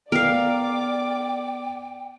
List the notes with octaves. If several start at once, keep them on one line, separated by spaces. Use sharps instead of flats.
B3 A#4 D5 F5 G5 D6